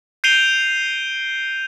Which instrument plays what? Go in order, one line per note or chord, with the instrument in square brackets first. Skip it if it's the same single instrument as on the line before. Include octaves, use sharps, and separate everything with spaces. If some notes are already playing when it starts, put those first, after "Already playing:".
[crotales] G6 C7 D7 D#7 F7 G7